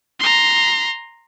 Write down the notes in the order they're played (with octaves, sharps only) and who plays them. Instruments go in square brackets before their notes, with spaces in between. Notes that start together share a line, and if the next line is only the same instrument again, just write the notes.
[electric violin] A#5 C6